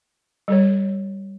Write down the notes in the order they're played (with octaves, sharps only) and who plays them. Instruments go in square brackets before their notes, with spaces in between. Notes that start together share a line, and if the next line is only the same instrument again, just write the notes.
[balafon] G3 A4 C#5